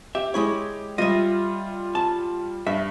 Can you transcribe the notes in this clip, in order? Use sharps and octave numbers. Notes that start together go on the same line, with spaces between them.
G4 E5
G#3 E4 C#5
G3 F4 D#5 E5
A5
G2 E5